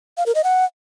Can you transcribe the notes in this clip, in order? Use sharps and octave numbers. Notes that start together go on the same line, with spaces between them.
F5
A#4
D#5
F#5